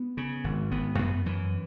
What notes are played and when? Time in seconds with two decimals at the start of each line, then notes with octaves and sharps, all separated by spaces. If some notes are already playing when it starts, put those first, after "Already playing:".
Already playing: B3
0.17 C#3
0.44 G#1
0.71 G#1 B3
0.99 F#2 B3
1.26 F#2 E3